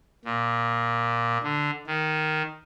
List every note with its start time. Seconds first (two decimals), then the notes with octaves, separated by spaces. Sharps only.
0.25 A#2
1.43 D3
1.87 D#3